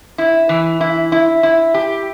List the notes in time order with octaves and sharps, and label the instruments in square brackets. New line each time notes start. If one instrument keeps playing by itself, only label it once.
[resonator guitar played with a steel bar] E4
E3
E4
E4
E4
G4